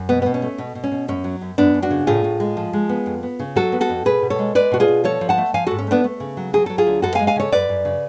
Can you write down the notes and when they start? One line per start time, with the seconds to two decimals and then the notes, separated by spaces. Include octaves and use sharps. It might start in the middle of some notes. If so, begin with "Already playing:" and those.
Already playing: F#2
0.09 B2 B3
0.22 B2 B3
0.34 C#4
0.42 A3
0.58 B2
0.75 B2
0.84 C#4
0.91 B2
1.08 F#2 C#4
1.24 F#3
1.41 F#2
1.58 F#2 B3 D4
1.74 F#2
1.82 D4 F#4
1.91 C#3
2.07 A2 F4 G#4
2.24 A2
2.40 G#3
2.57 F3
2.73 G#3
2.89 B3
3.06 F2
3.23 B3
3.39 C#3
3.56 F#3 F#4 A4
3.72 B3
3.81 F#4 A4
3.90 F2
4.05 B2 G#4 B4
4.22 B2
4.30 A4 C#5
4.39 G#3
4.55 G#3 B4 D5
4.72 B2 F#4
4.80 F4 G#4
4.88 B2
5.04 F3 A4 C#5
5.21 F3
5.29 F#5 A5
5.38 A3
5.54 F3 F5 G#5
5.67 G#2 F#4 A4
5.79 C#4
5.87 A3 B3 D4
6.04 A3
6.20 C#3
6.37 F#3
6.53 F#3 G#4
6.66 F#3 A4
6.78 F4 G#4
6.87 D2
7.02 F#2 F#4 A4
7.15 F5 G#5
7.19 G#3
7.27 F5 G#5
7.36 C#3 A4 C#5
7.52 F#2 B4 D5
7.69 F#2
7.85 C#3